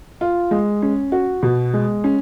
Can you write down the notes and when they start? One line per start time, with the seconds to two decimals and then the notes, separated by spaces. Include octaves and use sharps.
0.21 F4
0.51 G#3
0.82 C#4
1.12 F#4
1.43 B2
1.73 G#3
2.04 C#4